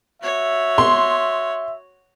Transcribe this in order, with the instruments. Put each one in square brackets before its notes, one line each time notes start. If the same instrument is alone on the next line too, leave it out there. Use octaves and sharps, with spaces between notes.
[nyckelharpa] F#4 C#5 [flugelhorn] E5
[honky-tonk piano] C6